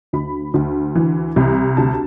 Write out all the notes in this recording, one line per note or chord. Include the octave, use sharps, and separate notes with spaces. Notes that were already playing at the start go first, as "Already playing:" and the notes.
D2 B5
D2
E3
C2
D2 A5